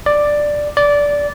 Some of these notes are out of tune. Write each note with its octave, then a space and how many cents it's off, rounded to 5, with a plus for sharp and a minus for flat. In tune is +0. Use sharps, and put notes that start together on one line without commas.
D5 +5
D5 -15